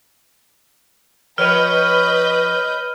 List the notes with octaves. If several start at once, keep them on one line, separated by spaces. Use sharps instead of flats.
F3 A#4 B4 C#5 D#5 F6 G6 D#7